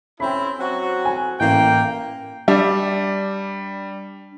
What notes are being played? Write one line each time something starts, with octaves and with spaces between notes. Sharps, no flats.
C4 C#4 E4 G5 B5
F#3 C4 F#4
G#5
A1 A#3 G5
G3 D4 E5